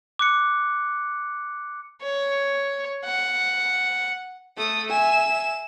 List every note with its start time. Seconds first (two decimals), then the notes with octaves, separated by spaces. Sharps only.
0.19 D6 F#6 C#7
2.02 C#5
3.05 F#5
4.57 A3 A4 D#6
4.90 E5 G#5 E7